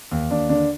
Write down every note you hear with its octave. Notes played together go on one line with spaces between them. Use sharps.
D#2
D#2 D4
D3 D4